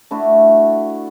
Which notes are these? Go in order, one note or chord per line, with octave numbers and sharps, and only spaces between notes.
A3 D4 E4 F#4